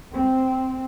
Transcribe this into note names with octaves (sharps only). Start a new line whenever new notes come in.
C4